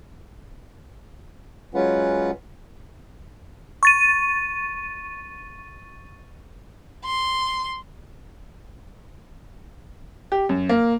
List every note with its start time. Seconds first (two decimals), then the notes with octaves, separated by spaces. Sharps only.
1.74 F#3 G#3 C#4 F4 B4 F#5
3.83 C#6 A6 D#7
7.04 C6
10.32 G4
10.49 F#2
10.69 A#3